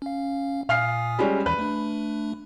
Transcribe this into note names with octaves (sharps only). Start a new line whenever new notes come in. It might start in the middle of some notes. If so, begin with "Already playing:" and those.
C#4 F5
A#2 F5 G#5 D#6 F6 C7
G3 G#3 C#4
D#2 E3 B4
A3 D4